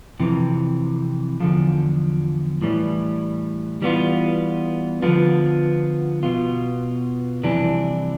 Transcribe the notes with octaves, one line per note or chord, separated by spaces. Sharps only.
F2 C3 E3
E2 D3 F3
A2 E3 G3
E3 G3 B3 F4
D3 F3 B3 F4
B2 B3 F4
F2 C3 E3 G3 D4